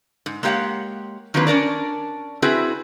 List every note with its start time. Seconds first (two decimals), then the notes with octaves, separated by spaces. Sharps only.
0.26 G#2
0.43 G#3 A#3 G4 C#5 F5 F#5
1.34 D#3 F#3 A#3 C4 F4 B4
1.47 C#4 D4 A#4 D5
2.42 C4 E4 F#4 G#4 B4